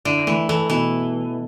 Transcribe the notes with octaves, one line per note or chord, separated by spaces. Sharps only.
D3 E4
E3 A3
E3 A4
B2 E3